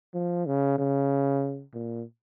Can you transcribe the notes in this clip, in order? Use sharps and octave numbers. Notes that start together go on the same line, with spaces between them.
F3
C#3
C#3
A#2